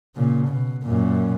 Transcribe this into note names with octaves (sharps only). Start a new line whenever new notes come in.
A#2 C#3
B2
F#2 A#2